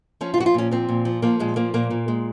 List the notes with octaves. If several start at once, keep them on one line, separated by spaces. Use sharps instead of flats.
F3 C#4
F4
F3 F#4
F4
A#2 C#4
F3 C4
A#2
F3
F3 A#3
A#2 G#3
F3 A#3
A#2 A#3
A#2
G#3